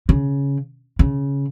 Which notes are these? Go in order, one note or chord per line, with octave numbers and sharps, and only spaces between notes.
C#3
C#3